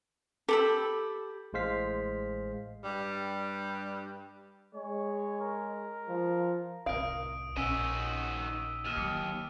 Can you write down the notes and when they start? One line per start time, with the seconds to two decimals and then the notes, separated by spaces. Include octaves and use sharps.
0.49 G4 A4 B5 E6
1.53 A1 A2 G#3 C5 F5 B6
2.83 G2 G3
4.75 G#3 C#5
5.41 A#4
6.08 F3
6.86 C2 A2 A#4 F5 D#6 D7
7.57 A#1 D#3 C#4 F#4 E6 B6 D#7
8.85 D#2 F6 D#7 E7
8.97 E3 F#3 D6 C#7 D#7